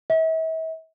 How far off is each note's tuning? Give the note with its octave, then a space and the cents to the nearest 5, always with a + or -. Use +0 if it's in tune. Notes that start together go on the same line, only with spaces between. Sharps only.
E5 -40